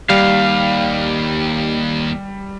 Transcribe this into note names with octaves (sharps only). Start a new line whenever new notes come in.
D#2 G3 F5